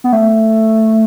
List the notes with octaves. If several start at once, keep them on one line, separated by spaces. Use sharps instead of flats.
B3
A3